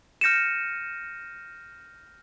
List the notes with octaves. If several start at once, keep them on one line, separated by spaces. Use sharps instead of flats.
F6 G6 A#6 C#7 D#7 E7